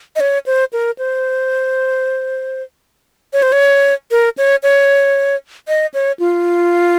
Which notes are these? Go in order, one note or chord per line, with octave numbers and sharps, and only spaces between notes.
D#5
C#5
C5
A#4
C5
C#5
C5
C#5
A#4
C#5
C#5
D#5
C#5
F4